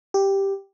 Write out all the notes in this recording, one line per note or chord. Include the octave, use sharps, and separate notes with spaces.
G4